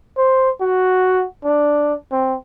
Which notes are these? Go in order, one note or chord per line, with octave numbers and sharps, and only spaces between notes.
C5
F#4
D4
C4